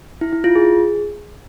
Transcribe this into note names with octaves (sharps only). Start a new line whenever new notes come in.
E4
E4
F4
G#4